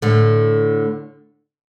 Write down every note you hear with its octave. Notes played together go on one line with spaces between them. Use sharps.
A2 D3